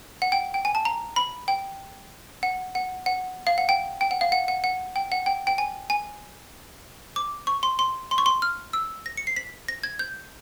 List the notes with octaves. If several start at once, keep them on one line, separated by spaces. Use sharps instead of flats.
F#5
G5
G5
G#5
A5
A#5
B5
G5
F#5
F#5
F#5
F5
F#5
G5
G5
F#5
F5
F#5
F#5
F#5
G5
F#5
G5
G5
G#5
G#5
D6
C#6
C6
C6
C6
C#6
C6
F6
E6
A#6
C#7
C7
B6
A#6
G#6
G6